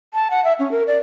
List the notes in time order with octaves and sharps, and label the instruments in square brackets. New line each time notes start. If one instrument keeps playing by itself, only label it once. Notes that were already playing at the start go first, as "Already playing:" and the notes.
[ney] A5
F#5
E5
C#4
A#4
D5